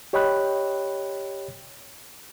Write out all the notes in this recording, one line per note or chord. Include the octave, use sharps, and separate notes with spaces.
G4 C#5 D#5 G5 B5 F#6